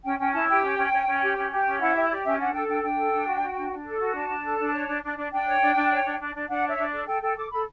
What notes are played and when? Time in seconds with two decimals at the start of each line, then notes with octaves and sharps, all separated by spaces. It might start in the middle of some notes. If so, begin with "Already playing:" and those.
0.04 C#4 G5
0.19 C#4 G5
0.33 E4 A5
0.48 G4 G5
0.63 C#4
0.77 C#4
0.93 C#4
1.07 C#4
1.21 G4
1.37 C#4
1.51 G4
1.65 C#4
1.80 E4 F#5
1.95 G4 E5
2.10 G4 D5
2.24 C#4 E5
2.39 D4 F#5
2.53 A4 G5
2.67 D4 G5
2.82 D4 G5
2.97 A4
3.12 D4
3.27 F#4
3.41 F#4
3.56 D4
3.71 D4
3.85 A4
4.00 F#4
4.15 D4 A5
4.29 D4
4.43 A4
4.58 D4
4.73 C#5
4.87 D4
5.03 D4
5.17 D4
5.32 D4 G5
5.46 C#5
5.61 D4
5.75 D4
5.90 C#5
6.05 D4
6.20 D4
6.34 D4
6.48 D4 F#5
6.64 C#5 E5
6.78 D4
6.88 D5
6.93 A4
7.07 A4 G5
7.22 A4 G5
7.37 A4 D6
7.51 A4 B5